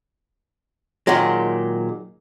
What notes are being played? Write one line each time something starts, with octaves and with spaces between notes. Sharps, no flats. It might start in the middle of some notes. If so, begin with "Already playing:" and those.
A#2 D#3 F#3 G#3